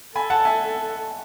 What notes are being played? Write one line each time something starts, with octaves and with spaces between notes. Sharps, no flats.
A4 G#5 B5
F#5 A5
E5 G#5